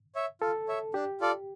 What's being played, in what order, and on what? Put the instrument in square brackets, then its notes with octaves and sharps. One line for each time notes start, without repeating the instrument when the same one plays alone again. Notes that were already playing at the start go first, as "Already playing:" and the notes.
[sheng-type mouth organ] C#5 E5
[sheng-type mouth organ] F4 [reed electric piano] A4
[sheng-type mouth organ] C#5 E5
[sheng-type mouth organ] D4 [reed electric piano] G4
[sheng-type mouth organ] F4 A4 D5